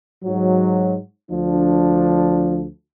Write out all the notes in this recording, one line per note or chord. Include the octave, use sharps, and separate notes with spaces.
G#2 F#3
D2 F3 D4